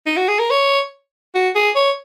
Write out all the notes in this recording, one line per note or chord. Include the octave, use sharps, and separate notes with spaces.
D#4
F#4
G#4
A#4
C#5
F#4
G#4
C#5